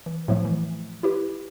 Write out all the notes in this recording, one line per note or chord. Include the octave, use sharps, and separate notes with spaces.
E3
A2 F3 F#3 A3
E3
E4 G4 B4